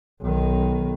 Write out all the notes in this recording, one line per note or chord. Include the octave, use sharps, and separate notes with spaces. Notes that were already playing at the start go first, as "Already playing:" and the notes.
B1 D#3